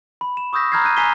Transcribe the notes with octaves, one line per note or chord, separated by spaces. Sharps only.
B5
E7
C#6 D#6 E6 G6 A#6 B6
A#5 B5 F6 G6 G#6 C7
F#6 G6 D#7
G#5 A#5 B6 C7 D#7 G7